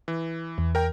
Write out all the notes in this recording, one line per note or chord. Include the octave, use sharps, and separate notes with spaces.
E3
E2
A#4 G5